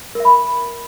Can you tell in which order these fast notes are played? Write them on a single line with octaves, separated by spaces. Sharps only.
A#4 E5 B5